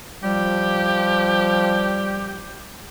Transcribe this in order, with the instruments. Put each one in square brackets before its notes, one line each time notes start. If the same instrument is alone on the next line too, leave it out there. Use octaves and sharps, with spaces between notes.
[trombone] F3 [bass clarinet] G3 [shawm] G4